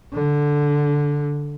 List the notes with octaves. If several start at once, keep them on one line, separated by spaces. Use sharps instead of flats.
D3